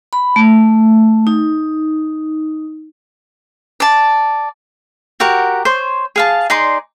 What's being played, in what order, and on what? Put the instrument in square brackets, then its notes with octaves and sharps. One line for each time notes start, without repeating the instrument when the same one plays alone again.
[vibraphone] B5
A3
D#4
[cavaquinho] D5 A5
F#4 G4 A#4 F#5
C5 C#5
G#4 F5 A5
D#4 G#4 D5 C6